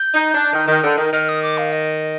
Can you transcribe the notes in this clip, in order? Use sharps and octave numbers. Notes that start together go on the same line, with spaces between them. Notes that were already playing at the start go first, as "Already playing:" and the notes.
Already playing: G6
D#4
D4
D#3
D#3
D3
D#3
D#3 F6
D#6
D6
F5
D#5